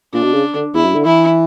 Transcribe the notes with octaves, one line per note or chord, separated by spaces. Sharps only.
A#2 D4
B2
C#3
D3
E2 E4
F#2
D3
E3 E4